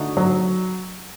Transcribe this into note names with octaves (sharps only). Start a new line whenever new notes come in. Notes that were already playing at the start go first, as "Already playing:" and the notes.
Already playing: D3 A3 D#4 F#4
F#3